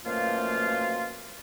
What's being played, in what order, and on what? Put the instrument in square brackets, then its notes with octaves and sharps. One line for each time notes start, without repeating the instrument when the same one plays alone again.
[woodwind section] F#2 B2 F3 A3 A#3 F4